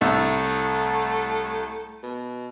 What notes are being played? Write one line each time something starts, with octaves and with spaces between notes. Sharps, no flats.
C2 A2 A3 E5
B2